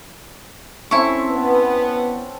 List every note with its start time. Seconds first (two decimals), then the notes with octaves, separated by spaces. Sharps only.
0.91 C4 C#4 E4 A4 C#6
1.30 B3